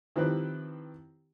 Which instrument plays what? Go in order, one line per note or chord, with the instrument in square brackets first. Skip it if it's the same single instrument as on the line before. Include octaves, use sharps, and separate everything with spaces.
[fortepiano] D#3 F3 C4 E4 G4 B4